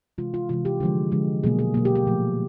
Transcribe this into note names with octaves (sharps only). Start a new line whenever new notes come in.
C3 E3 G#3 F4
F4
C3 E3 G#3 F4
G4
D3 F3 G#3
D3 F3 G#3
B2 F#3 A#3 G#4
G#4
B2 F#3 A#3
G4
G4
A#2 F3 A3